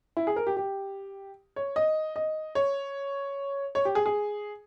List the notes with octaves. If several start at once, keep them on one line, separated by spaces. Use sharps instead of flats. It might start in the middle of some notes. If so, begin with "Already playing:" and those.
E4
G#4
A#4
G4
G4
C#5
D#5
D#5
C#5
C#5
G4
G#4
G#4